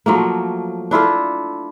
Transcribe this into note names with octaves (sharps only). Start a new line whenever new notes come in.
F3 F#3 A3 A#3
D4 E4 F4 A4